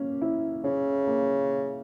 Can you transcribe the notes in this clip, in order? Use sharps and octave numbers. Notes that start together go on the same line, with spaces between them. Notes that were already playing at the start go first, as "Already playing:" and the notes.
Already playing: A#3 C#4
E4
C#3 C#4
A#3